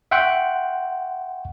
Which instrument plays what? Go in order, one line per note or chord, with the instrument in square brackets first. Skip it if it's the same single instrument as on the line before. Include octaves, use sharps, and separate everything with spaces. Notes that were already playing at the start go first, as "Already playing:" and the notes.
[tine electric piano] E5 F#5 G5 C6 C#6 F#6